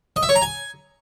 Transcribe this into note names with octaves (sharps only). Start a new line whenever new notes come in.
D#5
E5
C#5
A#5
G#5